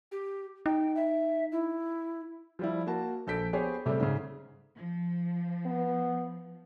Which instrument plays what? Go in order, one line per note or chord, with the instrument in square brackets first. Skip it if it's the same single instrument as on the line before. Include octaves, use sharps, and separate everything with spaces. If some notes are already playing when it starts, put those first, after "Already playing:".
[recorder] G4
[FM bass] D#4 [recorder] G5
[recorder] E5
E4
[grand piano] F3 G3 E4
A#3 F#4 A5
A#1 A4 G6 B6 D7
B3 G4 G#4 C5 C#5
C3 G3 A3
G#2 C#3
[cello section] F3
[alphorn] B3